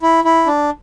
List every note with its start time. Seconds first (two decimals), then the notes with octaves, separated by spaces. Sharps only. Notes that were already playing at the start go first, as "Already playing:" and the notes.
0.02 E4
0.24 E4
0.47 D4